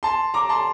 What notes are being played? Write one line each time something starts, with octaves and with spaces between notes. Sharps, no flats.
A5 C6
A#5 D6
A5 C6